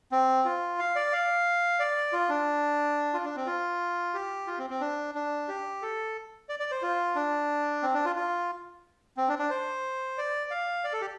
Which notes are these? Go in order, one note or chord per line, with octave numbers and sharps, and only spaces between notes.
C4
F4
F5
D5
F5
D5
F4
D4
F4
D4
C4
F4
G4
F4
C4
C4
D4
D4
G4
A4
D5
D5
C5
F4
D4
C4
D4
F4
F4
C4
D4
D4
C5
D5
F5
D5
A4
G4